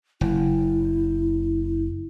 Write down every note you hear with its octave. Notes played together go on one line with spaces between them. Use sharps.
F#1 E4